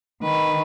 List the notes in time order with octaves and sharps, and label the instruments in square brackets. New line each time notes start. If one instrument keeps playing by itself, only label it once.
[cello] D#3 [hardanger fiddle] B4